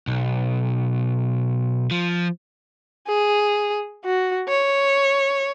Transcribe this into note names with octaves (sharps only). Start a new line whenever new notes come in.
B1
F3
G#4
F#4
C#5